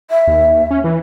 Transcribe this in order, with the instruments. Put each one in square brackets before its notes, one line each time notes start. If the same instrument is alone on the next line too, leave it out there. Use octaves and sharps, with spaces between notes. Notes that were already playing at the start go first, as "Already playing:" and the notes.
[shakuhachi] E5
[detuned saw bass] D#2
C#4
E3